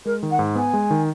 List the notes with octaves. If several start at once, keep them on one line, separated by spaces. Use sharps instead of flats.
G#3 A#4
D#3
F#5
G#2
B3 G#5
G#3
D#3